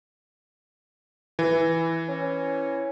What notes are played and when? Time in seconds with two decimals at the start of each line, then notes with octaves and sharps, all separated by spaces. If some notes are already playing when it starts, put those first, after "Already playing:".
1.39 E3
2.08 C#4